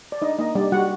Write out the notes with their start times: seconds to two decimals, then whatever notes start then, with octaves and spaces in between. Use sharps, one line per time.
0.12 D5
0.22 D4 D#4 D#5
0.39 A#3 D#4 D#5
0.55 G3 D4 D5
0.72 G3 F#4 F#5